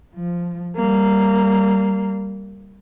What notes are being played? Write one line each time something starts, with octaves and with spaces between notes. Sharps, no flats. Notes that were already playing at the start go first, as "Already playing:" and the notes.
F3
G3 A#3